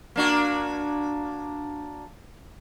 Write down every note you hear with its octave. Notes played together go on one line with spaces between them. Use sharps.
A#3 D4 F#4